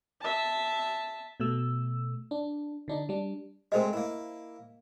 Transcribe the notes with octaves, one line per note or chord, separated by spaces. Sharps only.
E5 A5
B2 A3 E6
D4
D3 D4 D#4
G3 D4
G#3 A3 C4 A#4 C5 D#5
A#3 E4